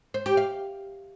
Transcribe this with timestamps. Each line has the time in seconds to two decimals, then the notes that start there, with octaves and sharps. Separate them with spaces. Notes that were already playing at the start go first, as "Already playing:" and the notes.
0.14 C5
0.26 G4
0.37 F5